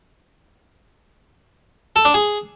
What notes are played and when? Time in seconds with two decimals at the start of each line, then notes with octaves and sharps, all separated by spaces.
1.96 A4
2.05 D4
2.14 G#4